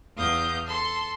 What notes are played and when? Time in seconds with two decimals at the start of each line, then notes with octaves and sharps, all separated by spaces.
0.15 E2 F5 D#6 G6
0.67 A4 C6